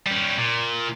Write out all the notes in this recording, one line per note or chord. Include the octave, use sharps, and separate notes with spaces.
G3 C#4
A#2